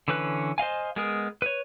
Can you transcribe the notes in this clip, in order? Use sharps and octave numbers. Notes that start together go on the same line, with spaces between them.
D3 E3 C#4 B4 F#6
C5 D#5 F5 G#5
G#3 B3 G#4 A#4
B4 C#5